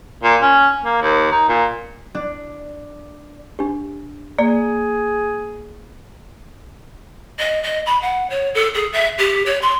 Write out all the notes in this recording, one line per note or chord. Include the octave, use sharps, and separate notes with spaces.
A#2
C#4
A#3
D#2
D#4
A#2
D4
D4 G4
A#3 G#4 D5
D#5
D#5
B5
F#5
C#5
A4
G#4
E5
G4
C#5
C6